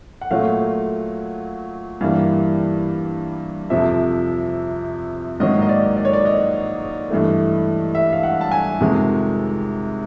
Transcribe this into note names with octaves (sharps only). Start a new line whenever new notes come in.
F#5
A#2 F#3 A3 F5
G2 E3 G3 A#3 F5
F2 C3 F3 E5
G#2 D#3 F#3 A#3 D#5
D#5
D5
D5
C#5
D5
D#5
G2 E3 A3
E5
F5
F#5
A5
G#5
F2 C3 D#3 G#3